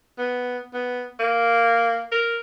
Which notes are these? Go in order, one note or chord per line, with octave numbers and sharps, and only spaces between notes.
B3
B3
A#3
A#4